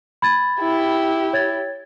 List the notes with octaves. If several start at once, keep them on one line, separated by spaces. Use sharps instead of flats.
B5 G#6 A6
E4 G4
C#5 G#6 A6